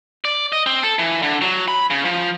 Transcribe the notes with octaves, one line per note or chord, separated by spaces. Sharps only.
D5
D#5
C4
A4
E3
D3
F#3
B5
C#3
F3